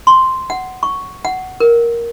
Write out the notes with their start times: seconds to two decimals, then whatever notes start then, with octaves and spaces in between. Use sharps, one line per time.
0.07 C6
0.50 F#5
0.83 C#6
1.25 F#5
1.60 A#4